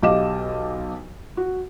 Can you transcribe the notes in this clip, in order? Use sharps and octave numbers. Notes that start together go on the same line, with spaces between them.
B1 G4 D#5 F5 D6 E7
F#4